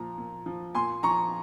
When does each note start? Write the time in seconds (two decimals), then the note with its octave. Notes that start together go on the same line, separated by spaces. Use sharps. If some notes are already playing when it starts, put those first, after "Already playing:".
Already playing: A#2 F3 A#5
0.18 A#2
0.46 F3
0.75 A#2 G#5 C6
1.03 F3 A#5 C#6